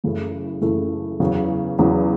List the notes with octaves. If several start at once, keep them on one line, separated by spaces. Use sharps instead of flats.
F#2 C#3 E3 A3 E4
F#2 C#3 E3 A3 E4
E2 C#3 F#3
E2 C#3 F#3